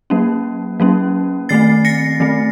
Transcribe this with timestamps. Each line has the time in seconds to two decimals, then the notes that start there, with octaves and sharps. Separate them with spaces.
0.10 F#3 A#3 C#4
0.80 F#3 A#3 C#4
1.49 D#3 A3 C4 A6 C7
1.85 A#6 C#7
2.20 D#3 A3 C4